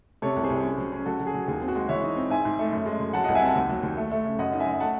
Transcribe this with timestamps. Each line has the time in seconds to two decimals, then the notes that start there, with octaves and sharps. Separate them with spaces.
0.22 C3 A4 C#5
0.37 C2
0.44 G#4 C5
0.50 C2
0.64 C#4
0.78 F#3
0.92 C#4
1.06 F#3 F#4 A4
1.20 F#3
1.27 G#4
1.34 F#3
1.48 D#2 G#4
1.62 C4
1.68 F#4
1.75 G#3
1.89 E3 C#5 E5
2.03 D#4
2.16 C4
2.30 G#2 E5 G#5
2.45 G#2
2.59 A3
2.72 F#2
2.86 G#3
3.00 F#2
3.13 F#3 F#5 A5
3.24 C2 D#5 F#5
3.35 E5 G#5
3.42 C4 F#5 A5
3.55 D#2
3.69 F#3
3.83 D#2
3.97 A3
4.11 A3
4.25 C#3
4.39 F#2 D#5 F#5
4.53 D#4
4.60 E5 G#5
4.66 F#2
4.80 A3 F#5 A5